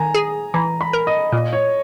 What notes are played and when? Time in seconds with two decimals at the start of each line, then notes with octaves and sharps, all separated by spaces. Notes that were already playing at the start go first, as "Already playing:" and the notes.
Already playing: D#3 G#5 A#5
0.14 G#4
0.54 E3 A#5
0.81 B5
0.93 A#4
1.07 D#5
1.32 A#2 D#5
1.53 C#5